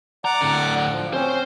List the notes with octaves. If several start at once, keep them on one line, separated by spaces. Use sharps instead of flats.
D5 F#5 A#5 D6
A2 D3
F3
C4 C#4 C5